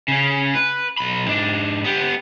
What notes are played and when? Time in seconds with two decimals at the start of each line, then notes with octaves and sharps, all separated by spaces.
0.08 C#3 C#4
0.55 B4
0.97 B1 B5
1.28 G#2 D4
1.84 B3 G4